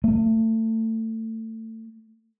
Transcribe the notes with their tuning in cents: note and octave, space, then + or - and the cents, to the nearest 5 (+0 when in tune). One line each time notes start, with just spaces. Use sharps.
A3 +25